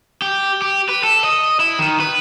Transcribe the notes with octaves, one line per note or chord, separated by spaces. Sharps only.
G4
G4
B4
A4
D#5
E4
D#3
B4